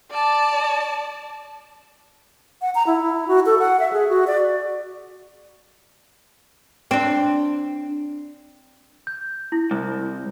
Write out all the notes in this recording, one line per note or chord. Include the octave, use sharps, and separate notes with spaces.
D5 A5
F#5
A#5
E4
E4
F#4
A4
F#5
E5
G#4
F#4
D5
C4 D4
G6
E4
C2